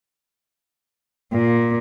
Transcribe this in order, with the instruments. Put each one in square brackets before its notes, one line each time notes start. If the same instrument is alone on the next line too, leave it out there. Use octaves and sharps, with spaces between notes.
[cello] A#2